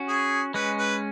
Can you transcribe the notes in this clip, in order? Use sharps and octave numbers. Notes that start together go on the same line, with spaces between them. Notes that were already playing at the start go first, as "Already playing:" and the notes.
Already playing: C#4 F#4
G#4
G#3 C#4 B4
B4